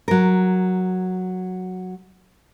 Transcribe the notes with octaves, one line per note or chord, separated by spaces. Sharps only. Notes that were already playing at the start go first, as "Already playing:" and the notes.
F#3 A#4